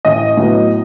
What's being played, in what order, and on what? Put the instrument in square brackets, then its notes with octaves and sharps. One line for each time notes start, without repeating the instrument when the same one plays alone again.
[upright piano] A1 D#5
A2 F#3 B3